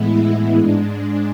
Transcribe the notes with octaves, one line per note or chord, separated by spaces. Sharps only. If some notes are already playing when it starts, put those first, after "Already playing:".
Already playing: A2 E3 G#3 B3 E4
G#2 G#3 D4